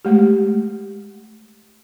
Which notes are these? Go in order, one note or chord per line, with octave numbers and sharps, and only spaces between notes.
G#3 A3 G4